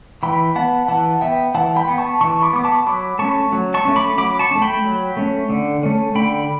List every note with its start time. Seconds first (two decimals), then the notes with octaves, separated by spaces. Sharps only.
0.23 E3 G5 B5
0.56 B3 F#5 A5
0.88 E3 F#5 A5
1.21 B3 E5 G5
1.55 E3 F#5 A5
1.76 G5 B5
1.87 B3
1.98 A5 C#6
2.21 E3 A5 C#6
2.42 B5 D6
2.53 B3 D6
2.64 A5 C#6
2.86 F#3 B5 D6
3.19 A3 C#4 A5 C#6
3.52 F#3
3.74 A5 C#6
3.85 A3 C#4
3.96 B5 D6
4.18 F#3 B5 D6
4.39 A5 C#6
4.51 C#4
4.55 A3
4.62 G5 B5
4.84 F#3
5.17 A3 C#4
5.50 D3
5.83 A3 C#4
6.15 D3 G5 B5